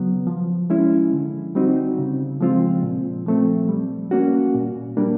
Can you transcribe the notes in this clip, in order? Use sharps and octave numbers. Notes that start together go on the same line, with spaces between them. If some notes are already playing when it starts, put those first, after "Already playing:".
Already playing: C#3 F#3 B3
F3
G#3 C#4 E4
D3
G3 C4 D#4 F#4
C#3
F3 G#3 C4 F4
A#2
F3 A3 C4
G3
A#3 C#4 F#4
A#2
G3 A#3 D4